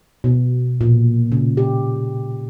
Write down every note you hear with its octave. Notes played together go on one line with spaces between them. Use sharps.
B2
A#2
C#3
G4